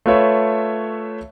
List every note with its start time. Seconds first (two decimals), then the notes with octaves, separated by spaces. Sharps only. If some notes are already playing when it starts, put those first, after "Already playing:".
0.06 A3 F4 B4 C#5 E5